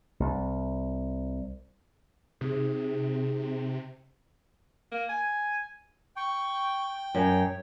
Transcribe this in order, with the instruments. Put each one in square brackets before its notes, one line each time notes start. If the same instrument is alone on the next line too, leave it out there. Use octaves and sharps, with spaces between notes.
[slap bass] C2
[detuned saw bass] C3 [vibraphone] D#4 G#4
[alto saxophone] A#3
G#5
[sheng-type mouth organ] G5 [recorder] C#6
[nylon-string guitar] F#2 [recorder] C#5